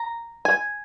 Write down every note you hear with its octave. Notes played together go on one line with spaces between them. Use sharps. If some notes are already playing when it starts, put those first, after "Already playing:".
Already playing: A#5
G#5